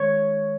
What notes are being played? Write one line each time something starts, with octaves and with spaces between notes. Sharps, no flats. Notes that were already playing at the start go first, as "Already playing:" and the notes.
Already playing: D#3 G#3 C#5